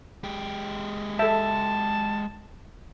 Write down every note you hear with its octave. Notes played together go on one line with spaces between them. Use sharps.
G#3 G4
A4 E5 A5